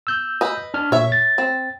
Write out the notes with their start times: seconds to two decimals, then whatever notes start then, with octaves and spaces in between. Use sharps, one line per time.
0.07 E6 G6
0.41 B4 D#5
0.74 D4 F6
0.92 A#2 C#5 E5
1.12 A6
1.38 C4